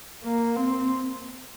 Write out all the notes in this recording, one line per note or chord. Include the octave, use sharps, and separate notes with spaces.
A#3
C4